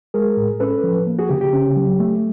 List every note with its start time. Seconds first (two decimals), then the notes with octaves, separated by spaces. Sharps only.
0.14 G#3 G#4 A#4
0.37 A2
0.60 C#4 A4 B4
0.84 F3
1.07 A#3
1.19 F#4 G#4
1.29 C#3 G4
1.41 G4
1.53 C#4
1.76 F#3
2.00 A3